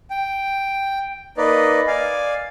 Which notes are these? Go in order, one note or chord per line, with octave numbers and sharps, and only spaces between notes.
G5
A#3 D#4 B4 D5 D#5
D5 F5 G#5